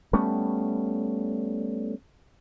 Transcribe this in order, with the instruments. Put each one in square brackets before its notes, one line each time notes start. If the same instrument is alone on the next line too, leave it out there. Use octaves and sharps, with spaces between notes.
[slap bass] G3 A3 B3 C#4